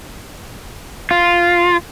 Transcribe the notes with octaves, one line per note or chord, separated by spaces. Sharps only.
F4